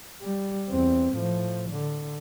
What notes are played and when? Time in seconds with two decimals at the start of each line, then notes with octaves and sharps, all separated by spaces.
0.22 G3
0.69 E2 C4
1.14 A2 F3
1.70 D3